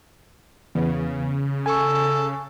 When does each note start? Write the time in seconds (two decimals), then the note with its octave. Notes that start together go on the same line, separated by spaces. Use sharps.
0.75 E2 C#3 B3
1.66 A4 G#5 C#6